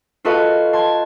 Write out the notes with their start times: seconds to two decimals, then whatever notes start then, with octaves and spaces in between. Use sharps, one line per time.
0.25 F4 F#4 A4 B4 D#5 F5
0.73 A5 C6 G#6